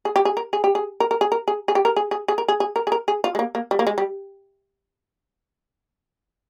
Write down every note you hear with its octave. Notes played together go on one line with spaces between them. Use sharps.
G#4
G4
G#4
A#4
G#4
G4
G#4
A#4
A#4
G#4
A#4
G#4
G#4
G4
A#4
G#4
G#4
G#4
A#4
G#4
G#4
A#4
G#4
A#4
G#4
F4
G#3
A#3
A#3
G3
A#3
G#3
G3